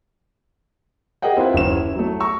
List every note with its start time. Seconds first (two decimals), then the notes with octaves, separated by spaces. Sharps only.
1.22 G4 G#4 A#4 D#5 F#5 G5
1.37 C4 E4 F4 B4
1.53 F#1 D#2 E7
1.71 E4
1.95 F#3 A3
2.20 A#5 C#6 E6